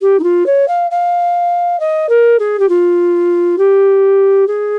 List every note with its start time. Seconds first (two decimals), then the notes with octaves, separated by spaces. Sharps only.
0.02 G4
0.19 D#4
0.23 F4
0.46 C#5
0.68 F5
0.91 F5
1.80 D#5
2.09 A#4
2.39 G#4
2.59 G4
2.69 F4
3.58 G4
4.47 G#4